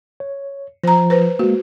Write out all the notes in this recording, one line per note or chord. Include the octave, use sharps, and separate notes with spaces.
C#5
F3 C5 A#5
B4 C5
G#3 A#3 F#4